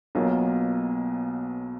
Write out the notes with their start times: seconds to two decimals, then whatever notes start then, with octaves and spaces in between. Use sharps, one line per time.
0.15 B1 B2 F#3 A#3 F4